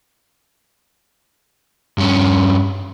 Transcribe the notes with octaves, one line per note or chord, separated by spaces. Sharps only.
G2 C#4